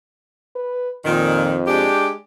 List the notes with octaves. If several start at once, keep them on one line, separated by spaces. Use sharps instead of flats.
B4
F2 A#2 D#3
G#3 D4 G4